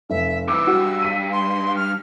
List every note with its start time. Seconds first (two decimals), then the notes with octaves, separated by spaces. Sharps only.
0.10 F1 E5
0.48 C2 E3 D6 E6
0.67 G2 F#4
1.02 B6 D#7
1.32 C6
1.76 F6